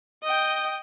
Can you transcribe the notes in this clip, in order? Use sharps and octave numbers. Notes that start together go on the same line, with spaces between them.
D#5 G5